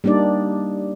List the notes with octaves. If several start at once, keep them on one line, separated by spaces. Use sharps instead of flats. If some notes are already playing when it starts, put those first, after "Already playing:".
G3 A#3 D4 D#4 D5